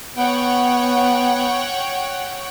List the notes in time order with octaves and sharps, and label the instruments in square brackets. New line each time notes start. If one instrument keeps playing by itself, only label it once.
[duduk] B3 [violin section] C#5 F#5 G5